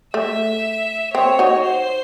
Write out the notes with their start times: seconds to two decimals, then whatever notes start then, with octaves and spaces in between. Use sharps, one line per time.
0.14 A3 E5
1.15 C4 C#5
1.39 D#4 F#4
1.65 C5